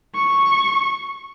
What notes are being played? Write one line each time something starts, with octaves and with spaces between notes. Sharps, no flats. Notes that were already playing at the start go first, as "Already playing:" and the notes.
C#6